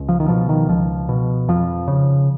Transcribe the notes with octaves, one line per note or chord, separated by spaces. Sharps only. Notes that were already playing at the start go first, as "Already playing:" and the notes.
Already playing: C#2
F3
D#3
B2 F3
D#3
C#2 F3
B2
F2 F3
C#3